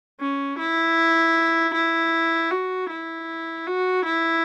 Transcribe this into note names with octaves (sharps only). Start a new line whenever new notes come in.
C#4
E4
E4
F#4
E4
F#4
E4